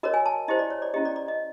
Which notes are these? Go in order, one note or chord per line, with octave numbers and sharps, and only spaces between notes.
F#4 A#4 C#5 D#5
G#5
A5
E4 G4 C5 D#5
D5
C#5
D5
C#4 E4 G4 D#5
D5
D5
D#5